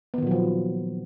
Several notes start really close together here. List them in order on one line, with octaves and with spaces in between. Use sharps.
B3 D#3 A#2 F#3 F3